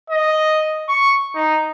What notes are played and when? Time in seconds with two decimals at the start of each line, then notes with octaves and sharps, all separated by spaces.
0.10 D#5
0.89 C#6
1.35 D#4